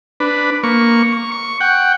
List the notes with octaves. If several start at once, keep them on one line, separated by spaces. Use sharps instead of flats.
D4 B4
A#3 C#6
C#6
C#6
F#5 G5